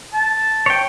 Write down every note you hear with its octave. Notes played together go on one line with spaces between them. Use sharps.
A5
C#5 G5